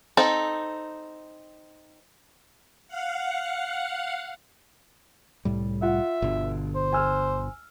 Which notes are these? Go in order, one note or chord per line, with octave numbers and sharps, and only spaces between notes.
C4 D#4 A4
F5 F#5
C2 A2 G3
F4 E5 F#5
G1 B2 D3
C5
G#5 E6 F6